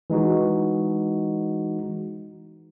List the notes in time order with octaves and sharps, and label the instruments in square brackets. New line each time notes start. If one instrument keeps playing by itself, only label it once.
[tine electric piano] E3 G#3 D#4 F#4